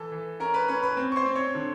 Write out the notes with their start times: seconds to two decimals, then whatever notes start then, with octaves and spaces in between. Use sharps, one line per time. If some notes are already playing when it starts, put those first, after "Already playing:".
Already playing: E3 A4 A5
0.12 E3
0.40 C#4 A#4 A#5
0.54 B4 B5
0.68 C#4 B4 B5
0.83 B4 B5
0.97 C4
1.12 C#6
1.16 C5 C6
1.26 C4
1.35 C#5 C#6
1.55 D3